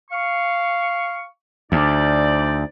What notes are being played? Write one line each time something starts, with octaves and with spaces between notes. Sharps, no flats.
F5 C#6
D2 D#4 C5 D5